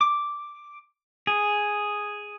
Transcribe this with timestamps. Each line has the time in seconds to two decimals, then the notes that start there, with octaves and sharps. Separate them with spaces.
0.01 D6
1.27 G#4